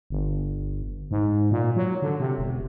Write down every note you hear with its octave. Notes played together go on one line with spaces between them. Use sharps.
G1
G#2
A#2
F#3
D3
C3
E1